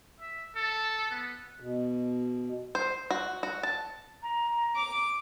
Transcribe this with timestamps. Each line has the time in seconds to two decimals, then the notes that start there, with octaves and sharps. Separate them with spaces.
0.20 E5
0.56 A4
1.11 B3
1.60 B2
2.75 C5
3.11 F#4
3.43 F#4
3.63 A5
4.22 A#5
4.76 D6